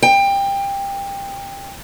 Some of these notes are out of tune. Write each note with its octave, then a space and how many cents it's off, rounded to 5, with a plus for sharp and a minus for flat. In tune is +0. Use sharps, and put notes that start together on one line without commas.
G5 +20